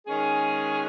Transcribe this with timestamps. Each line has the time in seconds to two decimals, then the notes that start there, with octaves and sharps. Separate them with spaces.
0.06 D#3 G#3 C#4 G#4